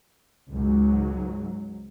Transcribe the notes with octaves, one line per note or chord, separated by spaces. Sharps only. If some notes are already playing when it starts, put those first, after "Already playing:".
C#2 G#2 F#3